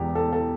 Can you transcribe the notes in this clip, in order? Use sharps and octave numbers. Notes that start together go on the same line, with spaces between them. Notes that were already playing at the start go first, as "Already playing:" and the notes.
Already playing: E1 E2 G4
A4
A4